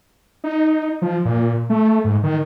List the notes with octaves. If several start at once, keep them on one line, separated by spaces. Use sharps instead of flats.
D#4
F3
A#2
A3
G#2
D#3